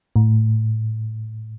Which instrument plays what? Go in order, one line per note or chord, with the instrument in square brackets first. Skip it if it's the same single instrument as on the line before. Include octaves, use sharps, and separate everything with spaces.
[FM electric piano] A2